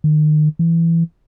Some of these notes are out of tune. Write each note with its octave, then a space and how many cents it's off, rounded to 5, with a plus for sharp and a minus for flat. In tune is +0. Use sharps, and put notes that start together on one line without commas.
D#3 -35
E3 +15